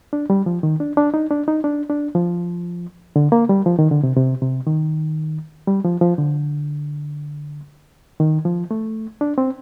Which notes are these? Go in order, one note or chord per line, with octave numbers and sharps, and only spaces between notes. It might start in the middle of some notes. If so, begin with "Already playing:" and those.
D4
G3
F3
D#3
D4
D4
D#4
D4
D#4
D4
D4
F3
D3
A#3
G3
F3
D#3
D3
C3
C3
C3
D#3
G3
F3
F3
D3
D#3
F3
A3
D4
C4